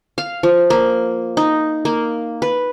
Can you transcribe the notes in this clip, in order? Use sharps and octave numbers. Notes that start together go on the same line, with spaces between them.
F5
F3
A#3
D#4
A#3
B4